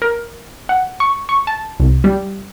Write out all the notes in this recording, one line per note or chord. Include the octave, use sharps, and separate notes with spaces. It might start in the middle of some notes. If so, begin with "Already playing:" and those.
A#4
F#5
C#6
C#6
A5
C2
G3